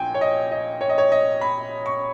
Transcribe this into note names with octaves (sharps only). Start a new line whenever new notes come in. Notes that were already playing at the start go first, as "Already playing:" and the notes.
Already playing: A#1 A#2 G5 G#5
C#5
D#5
D#5
C#5
D#5
C#5
D#5
B5
C#6